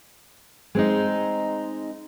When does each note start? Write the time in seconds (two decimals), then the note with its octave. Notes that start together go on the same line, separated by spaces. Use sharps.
0.75 G#3 C4 D#4